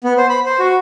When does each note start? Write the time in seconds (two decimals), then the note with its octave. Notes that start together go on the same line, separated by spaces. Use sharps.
0.04 B3
0.18 C5
0.29 B5
0.46 C5
0.59 F#4